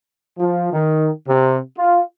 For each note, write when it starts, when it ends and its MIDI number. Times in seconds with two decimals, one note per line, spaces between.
0.38 0.69 53
0.73 1.10 51
1.27 1.59 48
1.77 2.02 65